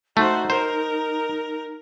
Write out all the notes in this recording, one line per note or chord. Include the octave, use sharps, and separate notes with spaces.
A3 D#4 F#4 C5
A#4 C5